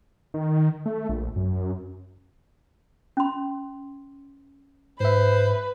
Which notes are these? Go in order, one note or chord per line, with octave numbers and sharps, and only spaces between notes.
D#3
A3
A#1
F#2
C#4 C6
G#2 B4 C5 E5